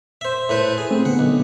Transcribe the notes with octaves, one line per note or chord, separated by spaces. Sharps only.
C5 E5
A2 B4 C5
G#4
A3 C4
D3 B3 F#5
B1